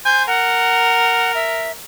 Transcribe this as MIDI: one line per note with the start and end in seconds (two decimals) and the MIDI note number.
0.05 0.25 72
0.05 0.25 80
0.05 0.23 91
0.27 1.74 70
0.27 1.32 78
1.35 1.72 76